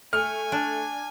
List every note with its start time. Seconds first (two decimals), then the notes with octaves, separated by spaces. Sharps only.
0.13 A3 G#5 F6
0.52 D4